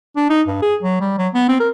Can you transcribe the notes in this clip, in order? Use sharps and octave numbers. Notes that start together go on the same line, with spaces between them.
D4
D#4
G2
G#4
F#3
G3
F#3
B3
C4
A#4